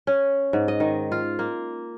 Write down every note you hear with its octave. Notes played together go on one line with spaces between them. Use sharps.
C#4
G#2
D#5
D#3
F4
A#3